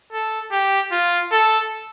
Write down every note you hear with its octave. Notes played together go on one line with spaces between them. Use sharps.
A4
G4
F4
A4